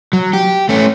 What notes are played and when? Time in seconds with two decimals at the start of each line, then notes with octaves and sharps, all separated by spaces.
0.13 F#3
0.33 G4
0.69 A3 C#4